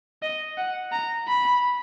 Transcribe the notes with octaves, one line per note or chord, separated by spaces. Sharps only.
D#5
F#5
A#5
B5